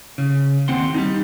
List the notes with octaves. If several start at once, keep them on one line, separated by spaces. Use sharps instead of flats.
C#3
D#2 C4 F#5 C6
G3 D#4